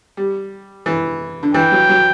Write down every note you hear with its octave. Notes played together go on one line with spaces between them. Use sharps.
G3
E3
D3
E3 G5
F#3
F#3